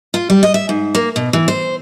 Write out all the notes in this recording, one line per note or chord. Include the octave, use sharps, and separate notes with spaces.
F4
G3
D#5
E5
G#2
A#3
B2
E3
C5